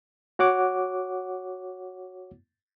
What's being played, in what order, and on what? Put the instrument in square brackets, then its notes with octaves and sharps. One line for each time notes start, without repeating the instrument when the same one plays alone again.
[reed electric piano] F#4 C#5 F#5 D6